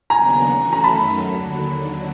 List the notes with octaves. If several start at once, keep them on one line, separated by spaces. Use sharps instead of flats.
D#2 C#3 F#3 B3 D4 G#5 A#5
E3 A3 C#4 F#4
A#5
F#2 D#3 F#3 A3 C#4 A5 B5
D#2 D3 F#3